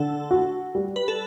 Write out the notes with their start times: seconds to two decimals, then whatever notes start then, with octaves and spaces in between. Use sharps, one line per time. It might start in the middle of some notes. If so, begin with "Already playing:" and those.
Already playing: D3 A4
0.31 F#4
0.75 G3
0.96 B4
1.08 A4